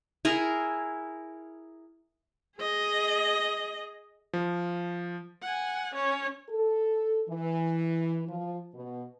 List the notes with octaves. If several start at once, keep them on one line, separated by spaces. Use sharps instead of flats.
E4 G#4 A#4
G#4 D#5
F3
F#5 G#5
C#4 C#5
A4
E3
F3
B2